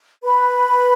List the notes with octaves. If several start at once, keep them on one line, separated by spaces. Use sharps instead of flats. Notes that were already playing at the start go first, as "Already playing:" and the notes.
B4 B5